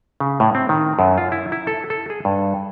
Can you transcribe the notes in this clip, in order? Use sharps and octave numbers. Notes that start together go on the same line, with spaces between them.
C#3
A2
C4
D#3
F#2
F4
E4
E4
A4
A4
G#4
G2